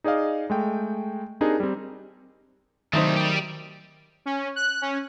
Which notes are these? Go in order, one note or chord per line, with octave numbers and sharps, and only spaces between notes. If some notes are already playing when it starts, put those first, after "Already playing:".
D#4 G#4 D5 D#5 F5
G#3 A3 G5
C4 D4 D#4 G4 G#4 A#4
G3 C4
D#3 F#3 G3 A3 C4 D#4 C5
G4 D5
C#4
F#6
C#4